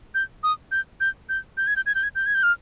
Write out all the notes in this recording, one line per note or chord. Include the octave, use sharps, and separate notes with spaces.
G6
D#6
G6
G6
G6
G6
G#6
G6
G#6
G6
G#6
G6
G#6
G6
F6